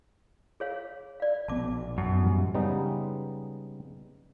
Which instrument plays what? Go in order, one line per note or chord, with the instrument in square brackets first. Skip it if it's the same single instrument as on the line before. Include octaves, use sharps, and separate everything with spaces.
[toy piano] G#4 C#5 F5
D5 F5
[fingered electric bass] A#1 B2 B3 [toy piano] A5 D6
[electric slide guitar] F#2 [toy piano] A5
[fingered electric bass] A2 E3 G3
[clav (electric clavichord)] C#3 G3 G#3 B3 D#4